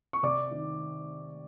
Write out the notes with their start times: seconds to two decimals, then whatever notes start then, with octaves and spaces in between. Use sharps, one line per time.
0.13 C#6
0.23 C3 D5 D6
0.51 D#3